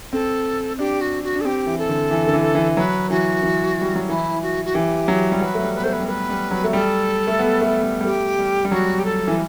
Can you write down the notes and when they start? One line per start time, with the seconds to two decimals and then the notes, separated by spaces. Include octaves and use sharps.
0.13 C4 A4
0.79 D4 G4
1.01 F#4
1.23 F#4
1.36 D4
1.40 A4
1.45 C4 G4
1.67 E3
1.78 A4
1.89 D3
2.11 E3
2.27 D3
2.33 E3
2.55 E3
2.77 F#3 B4
3.10 E3 F#4
3.43 E3
3.81 G3
3.95 F#3
4.08 E3 E4
4.42 F#4
4.65 F#4
4.74 E3 G4
5.08 F#3
5.32 G3
5.41 F#3 B4
5.55 A3
5.63 G3
5.74 B4
5.78 B3
5.83 A3 C5
5.92 B4
6.00 G3
6.07 A3 B4
6.30 G3
6.51 F#3
6.64 A3
6.73 G3 A4
7.27 A3
7.39 B3
7.61 A3
7.83 G3
8.01 G3
8.05 A3 G4
8.39 G3
8.65 G3
8.71 F#3 F#4
8.99 G4
9.05 A4
9.27 E3